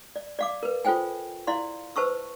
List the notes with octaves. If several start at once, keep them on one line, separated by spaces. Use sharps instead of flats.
D5
D5 F5 D6
A#4 B4
F4 A4 C5 G5 G#5
E4 D5 F5 C6
B4 C5 A5 C#6 E6